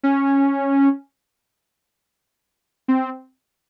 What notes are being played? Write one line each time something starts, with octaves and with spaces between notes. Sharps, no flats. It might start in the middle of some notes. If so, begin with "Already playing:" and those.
C#4
C4